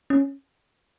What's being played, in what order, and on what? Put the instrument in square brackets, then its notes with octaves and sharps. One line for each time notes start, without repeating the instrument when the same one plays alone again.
[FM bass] C#4